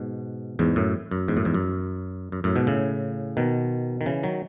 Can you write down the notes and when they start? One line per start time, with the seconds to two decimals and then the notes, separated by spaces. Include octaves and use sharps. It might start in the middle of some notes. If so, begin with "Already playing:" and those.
Already playing: G#2 B2
0.59 E2 G#2
0.76 F#2 A2
1.11 F#2
1.28 E2 G#2
1.37 F#2 A2
1.45 E2 G#2
1.54 F#2
2.32 F#2
2.44 F#2 A2
2.56 G#2 B2
2.67 A2 C#3
3.37 B2 D#3
4.01 D#3
4.06 C#3 E3
4.23 D#3 F#3